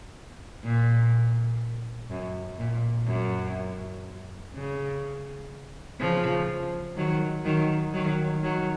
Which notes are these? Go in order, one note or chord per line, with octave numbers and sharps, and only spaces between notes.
A#2
F#2
A#2
F#2
C#3
C#3 F3
D#3 F#3
D#3 F#3
D#3 F#3
D#3 F#3